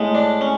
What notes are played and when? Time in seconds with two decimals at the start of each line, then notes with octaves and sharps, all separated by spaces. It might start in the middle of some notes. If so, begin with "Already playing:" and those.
Already playing: A2 G#3
0.15 D4
0.41 C#4